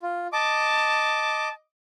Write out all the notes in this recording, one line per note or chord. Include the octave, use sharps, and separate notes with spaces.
F4
D#5 A5 D6